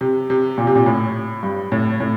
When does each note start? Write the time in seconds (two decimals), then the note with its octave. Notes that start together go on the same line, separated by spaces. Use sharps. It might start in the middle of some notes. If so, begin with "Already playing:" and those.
0.01 C3
0.30 C3
0.58 A#2
0.67 C3
0.75 A#2
0.86 A2
1.43 G2
1.72 A2
2.00 A2